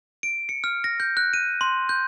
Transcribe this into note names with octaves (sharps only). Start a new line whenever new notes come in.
D7
C#7
F6
A#6
G6
F#6
D#7
C6
G6